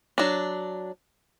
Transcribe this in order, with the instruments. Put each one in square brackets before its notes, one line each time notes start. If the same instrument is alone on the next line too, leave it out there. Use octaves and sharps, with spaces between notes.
[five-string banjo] F#3 D4